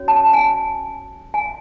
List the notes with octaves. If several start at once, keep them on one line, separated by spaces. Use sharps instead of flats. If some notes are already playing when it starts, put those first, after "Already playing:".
Already playing: C#4 F#4 C#5
A5
G#5
G#5